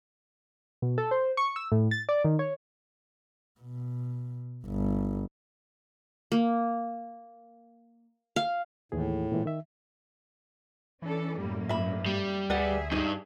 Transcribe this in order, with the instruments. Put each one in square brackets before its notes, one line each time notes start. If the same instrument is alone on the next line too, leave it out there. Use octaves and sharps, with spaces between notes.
[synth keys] B2
A4
C5
C#6
E6
A2
A6
D5
D#3
C#5
[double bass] B2
G1
[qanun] A#3
F5
[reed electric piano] D#2 E3 G#4 [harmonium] A2
[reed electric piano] A#2 E3 G#3
D#3 E5
[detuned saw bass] E3 [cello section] C#4 D4 A4
[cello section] F#2 A2 A#3 [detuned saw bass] G3
[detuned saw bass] G2 [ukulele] E5 B5
[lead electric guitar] G3
[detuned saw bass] D2 [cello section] G#4 E5 [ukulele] B4 D5 F#5
[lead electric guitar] E2 G2 [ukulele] D#4